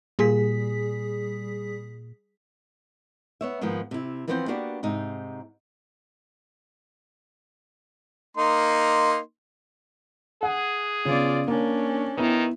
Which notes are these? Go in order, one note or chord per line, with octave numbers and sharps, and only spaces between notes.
A#2 G3 G#4 B6
B3 C#5 E5
G#2 D#3 F3 A#3 B3
C3 E4
E3 F3 B3 C4 A#4 C5
A#3 B3 D4 F#4 G4 B4
G#2 C3 D#4
A#3 D#4 C6
G#4 F#5
C#3 B3 F4 D5
A#3 C#4 D4
D#3 B3 E4